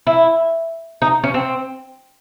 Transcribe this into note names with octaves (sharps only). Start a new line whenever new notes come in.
E4
D#4
C#4
C4